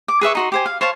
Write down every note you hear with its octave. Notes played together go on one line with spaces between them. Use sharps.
D6
G#4 B4 E5 C#6
D#4 F#4 C6
G4 C5 G#5
F5
C5 C#5 F5 A5